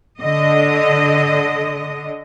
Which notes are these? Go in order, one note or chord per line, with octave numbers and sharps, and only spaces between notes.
D3 D#5